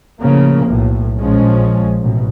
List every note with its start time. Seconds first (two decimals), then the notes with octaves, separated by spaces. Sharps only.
0.19 A2 C#3 F3 A#3
0.66 B1 A2
1.17 A#1 F3 G#3 C#4
2.00 A1 B2